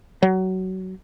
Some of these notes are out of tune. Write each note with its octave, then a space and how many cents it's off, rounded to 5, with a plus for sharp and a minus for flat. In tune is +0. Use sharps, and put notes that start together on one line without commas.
F#3 +20